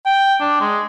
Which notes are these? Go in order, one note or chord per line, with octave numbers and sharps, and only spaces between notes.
G5
D4
G#3